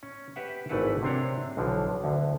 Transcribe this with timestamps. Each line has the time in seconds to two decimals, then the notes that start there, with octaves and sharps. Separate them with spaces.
0.03 C#4
0.36 G4 B4 E5 F#5
0.69 G#1 E3 A3 E4 B4 F#5
1.03 C3 C4 D4 C#5 A#5
1.57 B1 D3 E3 F3
2.04 D2 D3